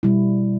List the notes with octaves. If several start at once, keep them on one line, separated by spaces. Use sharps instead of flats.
B2 G3 E4